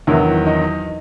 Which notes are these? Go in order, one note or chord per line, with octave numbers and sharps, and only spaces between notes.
E2 D#3 F#3 E4
D#4